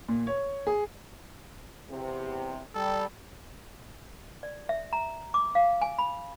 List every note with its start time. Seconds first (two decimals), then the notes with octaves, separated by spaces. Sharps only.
0.08 A#2
0.27 C#5
0.67 G#4
1.90 E2 C3
2.75 G3 A4
4.43 D5
4.69 E5
4.93 A#5
5.34 D6
5.55 F5
5.82 G#5
5.98 B5